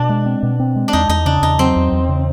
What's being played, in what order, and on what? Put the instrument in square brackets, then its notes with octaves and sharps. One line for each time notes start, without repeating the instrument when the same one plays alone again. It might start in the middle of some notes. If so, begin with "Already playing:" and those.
Already playing: [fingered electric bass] B2 [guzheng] D4
[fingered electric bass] G#3
C4
B2
C4
G#3
[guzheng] D4
[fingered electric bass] E2 [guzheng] D#4
[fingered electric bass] E2 [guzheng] D#4
[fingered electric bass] C#3 [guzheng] D4
[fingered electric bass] E2 [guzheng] D#4
[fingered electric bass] F#3 [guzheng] C4
[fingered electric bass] E2
E2
C#3